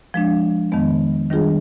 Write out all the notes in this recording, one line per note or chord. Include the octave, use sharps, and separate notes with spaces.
F3 G#3 D4
F2 D#3 G#3 B3
D#3 G3 D4 F4 G#4